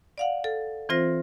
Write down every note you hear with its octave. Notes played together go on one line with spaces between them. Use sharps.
D5 F5 F#5
A4
E3 C4 F4 C5 A#6